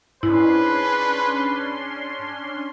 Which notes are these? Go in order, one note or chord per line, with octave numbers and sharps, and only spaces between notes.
G#2 C#4 D4 E4 B4 C6